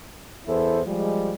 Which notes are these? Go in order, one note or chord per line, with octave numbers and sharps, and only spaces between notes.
E2 E4 A4 C5
F3 G3 G#3